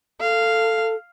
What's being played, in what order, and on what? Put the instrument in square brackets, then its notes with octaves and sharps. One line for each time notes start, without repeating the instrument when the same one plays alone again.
[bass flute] A4 [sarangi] F5